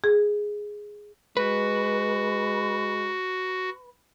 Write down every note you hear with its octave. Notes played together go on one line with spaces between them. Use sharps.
G#4
G#3 F#4 B4